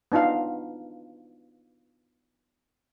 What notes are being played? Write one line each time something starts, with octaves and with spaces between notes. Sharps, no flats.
B3 D4 D#4 F4 F5